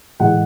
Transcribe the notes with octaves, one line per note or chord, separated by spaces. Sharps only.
A2 E3 G#3 F#5